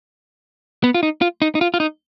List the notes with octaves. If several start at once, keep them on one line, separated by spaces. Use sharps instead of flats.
B3
F4
D#4
F4
D#4
D#4
F4
F4
D#4